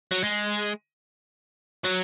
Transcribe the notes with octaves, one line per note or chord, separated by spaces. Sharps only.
F#3
G#3
F#3